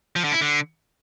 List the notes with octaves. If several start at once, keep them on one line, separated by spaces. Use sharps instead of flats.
F3
D3
E4
D3